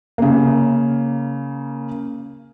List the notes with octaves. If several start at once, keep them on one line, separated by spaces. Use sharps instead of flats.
C#3 A#3